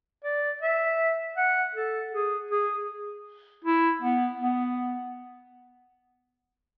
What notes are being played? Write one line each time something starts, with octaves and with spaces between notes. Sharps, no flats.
D5
E5
F#5
A4
G#4
G#4
E4
B3
B3